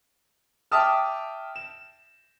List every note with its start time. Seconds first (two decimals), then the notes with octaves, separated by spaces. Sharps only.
0.72 E5 G5 A5 D6 D#6 F6
1.56 E7